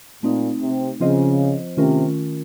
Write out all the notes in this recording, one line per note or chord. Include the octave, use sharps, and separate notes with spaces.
A#2 A3 C4 D#4
C3
C#3 F3 C4 F4 C5 D#5
C3 D#3 A3 C#4 F4 A#4